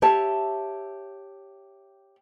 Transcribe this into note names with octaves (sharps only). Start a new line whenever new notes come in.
G4 C#5 E5 A5